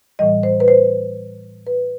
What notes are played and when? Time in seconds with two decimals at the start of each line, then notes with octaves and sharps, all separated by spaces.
0.19 A2 E3 G3 D#5
0.43 C5
0.60 B4
0.68 C5
1.67 B4